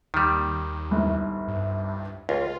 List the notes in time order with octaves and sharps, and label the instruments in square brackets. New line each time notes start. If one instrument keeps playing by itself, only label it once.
[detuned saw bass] D#2 [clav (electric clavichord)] D#3 G3
[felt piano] G1 C2 G#2
[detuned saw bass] G2
[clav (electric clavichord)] C#2 [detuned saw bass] F4